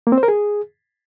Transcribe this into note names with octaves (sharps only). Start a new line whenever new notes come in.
A#3
C4
C5
A#4
G#4